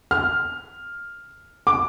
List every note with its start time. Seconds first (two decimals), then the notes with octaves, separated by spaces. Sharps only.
0.11 F6
1.67 D6